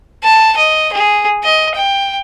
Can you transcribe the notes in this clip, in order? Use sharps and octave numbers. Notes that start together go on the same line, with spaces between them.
A5
D#5
G#4
D#5
G5